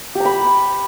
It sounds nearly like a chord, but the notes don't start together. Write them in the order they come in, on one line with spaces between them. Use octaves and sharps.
G4 A#5 B5